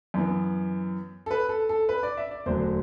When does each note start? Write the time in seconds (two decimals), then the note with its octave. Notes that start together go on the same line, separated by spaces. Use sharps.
0.14 F#2 E3 B3
1.26 A4
1.31 B4
1.49 A4
1.69 A4
1.89 B4
2.03 D5
2.17 E5
2.31 D5
2.46 E1 D2 D3 F#3 C5